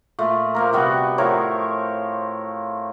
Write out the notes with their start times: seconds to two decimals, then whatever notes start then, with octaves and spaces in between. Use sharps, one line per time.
0.19 A#2 A3
0.55 F3 A#3 A#4
0.73 C3 G3 B3 F#4
1.18 A2 F3 A#4 C#5